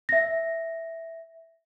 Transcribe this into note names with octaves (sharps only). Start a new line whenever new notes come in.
E5 A#6